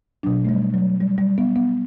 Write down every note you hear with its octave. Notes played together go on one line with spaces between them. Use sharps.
B2 F#3 D4
A3
G3
F#3
G3
G3
B3
B3